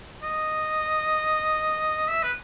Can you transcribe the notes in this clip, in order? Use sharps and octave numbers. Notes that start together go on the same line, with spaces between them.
D#5
E5
B4